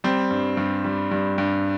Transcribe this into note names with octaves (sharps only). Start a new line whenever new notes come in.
G3 C4
G2
G2
G3
G2
G2